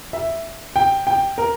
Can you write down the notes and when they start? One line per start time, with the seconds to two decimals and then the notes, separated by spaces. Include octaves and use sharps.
0.13 E5
0.76 G5
1.07 G5
1.38 A#4